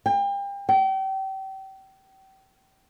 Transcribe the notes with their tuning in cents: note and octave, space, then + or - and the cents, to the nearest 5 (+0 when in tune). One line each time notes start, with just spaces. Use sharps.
G5 +35
G5 -30